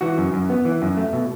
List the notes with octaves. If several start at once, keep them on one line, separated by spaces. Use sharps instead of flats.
E3 F#4
F#2
F#2
B3
E3
F#2
A3
B2